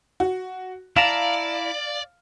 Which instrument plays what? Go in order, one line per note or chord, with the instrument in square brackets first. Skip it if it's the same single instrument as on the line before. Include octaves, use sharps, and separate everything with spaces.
[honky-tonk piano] F#4
[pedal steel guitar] E4 A5 A#5 [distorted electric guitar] D5 [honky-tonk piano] F5